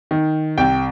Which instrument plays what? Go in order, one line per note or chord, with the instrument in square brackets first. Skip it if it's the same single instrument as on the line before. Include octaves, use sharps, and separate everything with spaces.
[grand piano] D#3
C2 G5